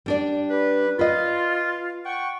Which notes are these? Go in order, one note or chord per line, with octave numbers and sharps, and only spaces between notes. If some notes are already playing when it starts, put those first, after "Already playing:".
G3 D4 D5
G4 B4
F4 B4 D#5
F#5 G5 C#6